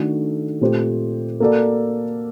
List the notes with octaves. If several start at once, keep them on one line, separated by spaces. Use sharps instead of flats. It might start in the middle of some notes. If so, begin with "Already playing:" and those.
Already playing: D#3 A3 D4 F#4 A4
A#2 A3 C4 G4 C5
A#3 F#4 A4 D5